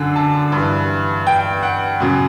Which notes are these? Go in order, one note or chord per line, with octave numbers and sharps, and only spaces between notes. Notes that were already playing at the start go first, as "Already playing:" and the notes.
Already playing: F#2 D3
A5
G2 E3
G5
F#5
F#2 C#3 F#3